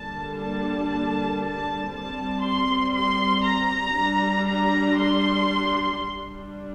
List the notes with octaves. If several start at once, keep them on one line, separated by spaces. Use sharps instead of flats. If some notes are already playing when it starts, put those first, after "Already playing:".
Already playing: D3 G3 A#3 D4 A5
A5
A5
G3 C4 A5
C6
C6
A#5
G3 D4
A#5
C6
G3 D4